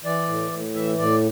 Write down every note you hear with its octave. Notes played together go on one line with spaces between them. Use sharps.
E3 D5
A2
A2
E3 E5
A2 D5